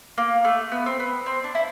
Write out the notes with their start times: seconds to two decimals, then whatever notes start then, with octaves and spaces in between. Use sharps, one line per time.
0.18 A#3
0.45 A3
0.72 B3
0.86 C4
1.00 B3
1.26 C4
1.44 D4
1.55 E4